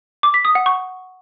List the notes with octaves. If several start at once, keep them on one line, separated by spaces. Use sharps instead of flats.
D6
B6
D#6
F#5
C#6